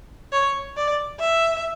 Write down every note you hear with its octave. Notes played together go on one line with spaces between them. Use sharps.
C#5
D5
E5